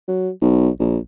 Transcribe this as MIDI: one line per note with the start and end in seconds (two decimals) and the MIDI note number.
0.08 0.30 54
0.42 0.69 35
0.80 0.98 34